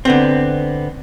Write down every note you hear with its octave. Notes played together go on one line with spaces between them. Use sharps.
D3 B3 C4